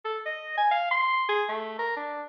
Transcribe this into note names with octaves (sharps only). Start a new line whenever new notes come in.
A4
D#5
G#5
F5
C6
G#4
A3
A#4
D4